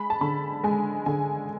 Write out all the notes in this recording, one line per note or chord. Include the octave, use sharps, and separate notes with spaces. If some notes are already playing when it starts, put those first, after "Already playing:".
Already playing: G#3 B5
A5
D3 B5
G#3 G#5
D3 G#5